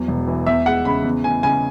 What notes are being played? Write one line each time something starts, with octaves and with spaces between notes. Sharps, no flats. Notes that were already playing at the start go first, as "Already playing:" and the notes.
Already playing: E2 F#3
E1
E3
E2 E5
G#3 F#5
C#3 B5
E2
E3 G#5
C#3 G#5